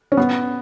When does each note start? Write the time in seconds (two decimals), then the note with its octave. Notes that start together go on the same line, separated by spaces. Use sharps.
0.12 C#4
0.17 B3